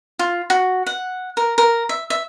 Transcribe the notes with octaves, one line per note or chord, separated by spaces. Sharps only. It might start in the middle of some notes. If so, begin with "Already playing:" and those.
F4
F#4
F#5
A#4
A#4
E5
E5